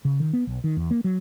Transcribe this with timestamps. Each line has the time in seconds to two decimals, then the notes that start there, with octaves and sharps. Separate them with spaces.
0.05 C#3
0.20 D#3
0.33 B3
0.47 B1
0.64 D#3
0.77 E2
0.91 A#3
1.04 F#3